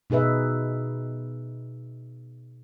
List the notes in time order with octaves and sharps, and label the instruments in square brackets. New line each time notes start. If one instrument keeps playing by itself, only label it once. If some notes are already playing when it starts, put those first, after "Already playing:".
[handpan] B2 D#4 G#4 B4 E5